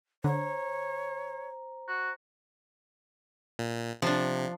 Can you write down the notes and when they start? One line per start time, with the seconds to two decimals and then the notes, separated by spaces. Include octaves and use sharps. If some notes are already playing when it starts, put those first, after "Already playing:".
0.24 D3 C5 C#5 A#5
1.88 F#4
3.59 A#2
4.02 C3 F3 D4